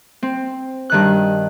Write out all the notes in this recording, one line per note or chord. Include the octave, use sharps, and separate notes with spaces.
C4
G2 D#3 F#6